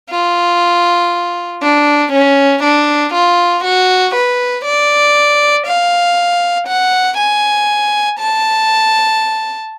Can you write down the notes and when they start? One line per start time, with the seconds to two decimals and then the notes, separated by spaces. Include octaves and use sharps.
0.10 F4
1.62 D4
2.12 C#4
2.63 D4
3.13 F4
3.64 F#4
4.15 B4
4.65 D5
5.66 F5
6.67 F#5
7.17 G#5
8.19 A5